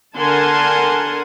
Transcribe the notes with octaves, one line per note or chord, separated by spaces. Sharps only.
D3 A#4 F#5 G#5 A5 C6